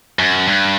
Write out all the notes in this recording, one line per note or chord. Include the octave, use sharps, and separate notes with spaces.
F#2
G2